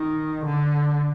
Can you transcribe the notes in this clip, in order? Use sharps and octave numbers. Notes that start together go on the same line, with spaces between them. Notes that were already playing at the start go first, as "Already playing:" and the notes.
Already playing: D#3
D3